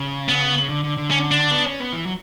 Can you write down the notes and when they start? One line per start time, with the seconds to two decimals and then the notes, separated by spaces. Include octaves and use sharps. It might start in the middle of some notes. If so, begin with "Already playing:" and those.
Already playing: C#3
0.29 B3
0.58 C#3
0.69 D3
0.84 D3
0.97 D3
1.11 C#4
1.31 D4
1.51 B3
1.66 C#4
1.80 B3
1.92 E3
2.06 F#3